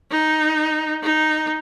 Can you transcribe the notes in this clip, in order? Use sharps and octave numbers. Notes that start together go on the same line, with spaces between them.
D#4
D#4